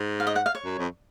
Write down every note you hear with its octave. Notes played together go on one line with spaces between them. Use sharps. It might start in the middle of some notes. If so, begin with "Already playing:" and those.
Already playing: G#2
F5
D#5
F#5
F5
C#5
F#2
F2